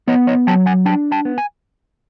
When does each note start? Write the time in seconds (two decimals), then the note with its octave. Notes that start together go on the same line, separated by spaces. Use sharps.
0.08 B3 C#5 D#5
0.27 C#5 D#5
0.47 F#3 G5 A5
0.66 F#5 G#5
0.86 D4 G5 A5
1.12 G5 A5
1.25 B3
1.38 G#5